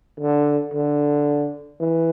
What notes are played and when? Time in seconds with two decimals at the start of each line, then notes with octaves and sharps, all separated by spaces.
0.20 D3
0.74 D3
1.80 E3